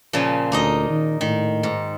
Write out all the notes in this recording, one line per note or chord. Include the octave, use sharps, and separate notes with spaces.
A#2 C#3 F3
D2 A#3 D#4 D#5
D#3
A2 D#3
G#2